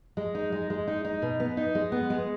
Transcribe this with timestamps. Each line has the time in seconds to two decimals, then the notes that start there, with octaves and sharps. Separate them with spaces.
0.17 G#3
0.35 D#4
0.52 G#3
0.70 G#3
0.87 D#4
1.05 D#4
1.22 B2
1.40 B3
1.57 D#4
1.75 G#3
1.92 B3
2.10 G#3